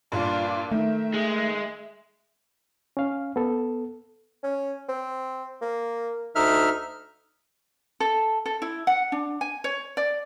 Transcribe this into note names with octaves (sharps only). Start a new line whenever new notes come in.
G2 A#2 D4 F4
D#3 A3 E5
G#3
C#4 F5
B3 A4
C#4
C4
A#3
D2 D#4 E5 F6
A4
A4
E4
F#5
D4
G#5
C#5
D5